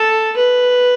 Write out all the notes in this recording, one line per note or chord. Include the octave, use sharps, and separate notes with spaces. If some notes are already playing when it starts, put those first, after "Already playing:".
Already playing: A4
B4